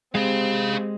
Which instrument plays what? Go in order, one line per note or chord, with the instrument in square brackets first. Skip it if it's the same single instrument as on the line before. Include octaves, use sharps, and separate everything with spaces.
[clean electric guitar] G#3 [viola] C4 G4 [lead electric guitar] G#4 F5